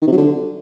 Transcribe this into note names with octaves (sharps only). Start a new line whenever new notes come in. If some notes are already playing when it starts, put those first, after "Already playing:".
D#3
C3
F#3
D3